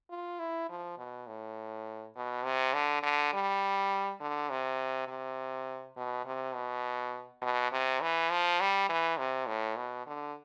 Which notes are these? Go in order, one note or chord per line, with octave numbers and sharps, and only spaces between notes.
F4
E4
F3
B2
A2
B2
C3
D3
D3
G3
D3
C3
C3
B2
C3
B2
B2
C3
E3
F3
G3
E3
C3
A2
B2
D3